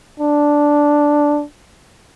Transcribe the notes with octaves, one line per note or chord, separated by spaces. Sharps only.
D4